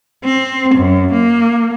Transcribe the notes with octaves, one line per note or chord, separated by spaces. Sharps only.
C4
F#2
A#3